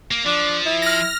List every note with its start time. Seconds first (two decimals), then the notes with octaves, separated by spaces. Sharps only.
0.11 A#3
0.26 F3 D4
0.66 E4
0.82 F6 A#6